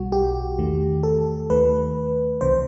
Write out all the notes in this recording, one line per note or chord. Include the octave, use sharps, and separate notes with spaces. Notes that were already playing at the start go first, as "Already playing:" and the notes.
Already playing: B1 B2 G3 F#4
G4
E2 D#3 A3
A4
D#2 D#3 A3 B4
C2 C3 E3 C5